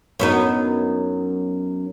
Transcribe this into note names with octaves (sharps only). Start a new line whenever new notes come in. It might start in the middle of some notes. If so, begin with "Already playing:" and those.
F#2 B3 D#4